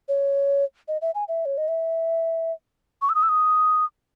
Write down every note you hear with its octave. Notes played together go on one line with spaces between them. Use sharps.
C#5
D#5
E5
G#5
E5
C#5
D#5
E5
C#6
E6
D#6
E6
D#6